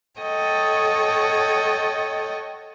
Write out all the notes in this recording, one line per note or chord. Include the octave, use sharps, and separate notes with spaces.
A4 C#5 D#5 F#5 G5